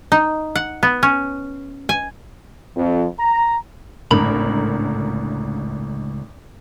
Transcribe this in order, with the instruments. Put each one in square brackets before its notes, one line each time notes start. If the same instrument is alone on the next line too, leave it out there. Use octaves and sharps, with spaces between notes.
[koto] D#4
F#5
B3
C#4
G#5
[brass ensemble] F2
A#5
[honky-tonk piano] G#1 D3 A#4 [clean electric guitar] C#2 A#5 B5 [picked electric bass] A2 A3